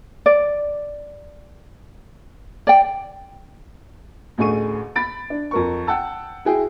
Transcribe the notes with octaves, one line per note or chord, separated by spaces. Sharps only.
D5
D5 G5
A1 D2 A3 G#4 C#6 D#7
B5 A6 D7
D4
F2 A#4 C#6
F#5 G5 A5 E6
E4 F#4 G#4 G5